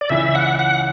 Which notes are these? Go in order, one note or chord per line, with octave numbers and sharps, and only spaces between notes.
D5
C#2 C#3 E3 E5
F#5
F#5